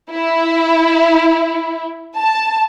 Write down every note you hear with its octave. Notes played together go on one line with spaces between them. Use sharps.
E4
A5